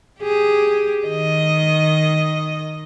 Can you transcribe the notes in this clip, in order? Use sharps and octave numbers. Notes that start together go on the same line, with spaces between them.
G4 G#4
D#3 D#5